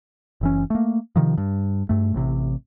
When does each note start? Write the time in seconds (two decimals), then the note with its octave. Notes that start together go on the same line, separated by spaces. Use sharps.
0.41 F#1 E3 C#4
0.70 A3 A#3
1.16 C3 D#3 F3
1.38 G2
1.89 G2 A3
2.14 A1 A2 C3